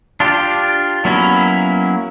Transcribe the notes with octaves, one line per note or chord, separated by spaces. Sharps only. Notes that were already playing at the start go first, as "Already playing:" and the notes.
D4 F4 G4
F#3 A#3 B3 C#4 E4